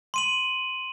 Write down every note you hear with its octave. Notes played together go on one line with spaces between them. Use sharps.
C6 D#7 F#7